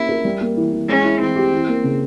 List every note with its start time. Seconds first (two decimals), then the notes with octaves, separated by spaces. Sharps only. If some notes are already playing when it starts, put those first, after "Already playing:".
Already playing: A#3 C#4 E4 G4
0.09 A#4
0.25 G3
0.41 A#3
0.57 E3
0.73 E3
0.89 G#3 C#4
1.05 E4
1.21 E3 C4
1.36 G4
1.53 E3
1.68 A#3
1.84 C#3